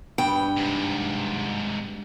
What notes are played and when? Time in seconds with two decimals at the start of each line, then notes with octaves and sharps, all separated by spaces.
0.18 G2 B3 G5
0.56 G#2 C3